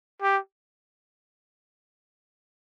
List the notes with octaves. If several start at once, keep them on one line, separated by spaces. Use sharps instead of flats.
G4